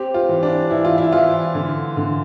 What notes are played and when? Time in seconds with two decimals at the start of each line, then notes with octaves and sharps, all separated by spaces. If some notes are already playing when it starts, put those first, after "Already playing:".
Already playing: C4 G4
0.14 F4
0.29 E3
0.43 D4
0.71 E3 E4
0.85 F4
0.98 E4
1.12 E3 F4
1.55 D3
1.97 D3